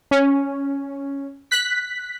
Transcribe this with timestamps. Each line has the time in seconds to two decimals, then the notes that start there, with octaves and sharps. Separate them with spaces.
0.11 C#4
1.51 F#6 B6